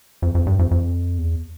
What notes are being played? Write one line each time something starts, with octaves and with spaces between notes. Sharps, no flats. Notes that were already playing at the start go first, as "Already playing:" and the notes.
F2
F2
G2
F2
F2
E2